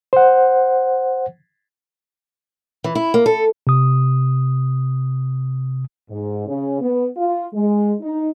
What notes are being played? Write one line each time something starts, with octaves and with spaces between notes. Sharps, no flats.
C5 F#5
E3
E4
A#3
A4
C3 D#6
G#2
C#3
B3
F4
G#3
D#4